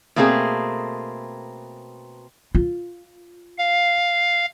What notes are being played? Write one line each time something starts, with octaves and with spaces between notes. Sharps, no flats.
B2 A3 A#3 C4 E4 G#4
F4
F5